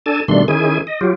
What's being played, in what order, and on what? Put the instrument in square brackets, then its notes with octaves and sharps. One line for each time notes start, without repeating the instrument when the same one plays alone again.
[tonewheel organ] D4 A4 G#5 A5
B2 D#3 G3 A3 D4 C6
D#3 C#4 E4 G#4 G#5
D#5
F#3 F4 G4